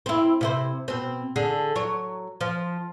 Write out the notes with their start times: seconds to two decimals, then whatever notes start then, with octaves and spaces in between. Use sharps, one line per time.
0.06 C4 E4
0.41 C3 E4 C5
0.88 B2 C4
1.36 D3 G#4
1.76 F#3 C#5
2.41 F3